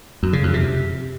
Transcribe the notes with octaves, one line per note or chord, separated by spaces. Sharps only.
F#2
C#3
F2
C3